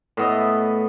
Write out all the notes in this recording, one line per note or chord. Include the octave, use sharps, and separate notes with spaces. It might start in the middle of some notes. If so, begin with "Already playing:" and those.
A2 B3 D#5